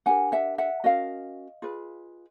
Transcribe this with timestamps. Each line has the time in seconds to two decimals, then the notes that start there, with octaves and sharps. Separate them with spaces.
0.06 D4 G4 A#4 F#5 G#5
0.32 E5 F#5
0.58 E5 F#5
0.84 C#4 F#4 A#4 D#5 F5
1.62 F4 G#4 B4